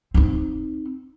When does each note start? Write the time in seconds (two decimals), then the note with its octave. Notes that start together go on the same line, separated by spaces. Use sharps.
0.14 C4 D#4